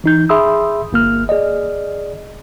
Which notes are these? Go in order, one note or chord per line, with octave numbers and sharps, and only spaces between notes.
E3 D#4 G6
G#4 E5 B5 C6 D#6 E6
G1 A#3 F6
G#4 D5 D#5